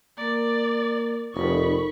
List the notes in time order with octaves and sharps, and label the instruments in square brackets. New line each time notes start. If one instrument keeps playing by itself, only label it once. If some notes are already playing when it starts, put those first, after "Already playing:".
[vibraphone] A#3 A#4 [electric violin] D5
[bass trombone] F1 [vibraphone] D#4 A4 A#4 [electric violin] B5 C#6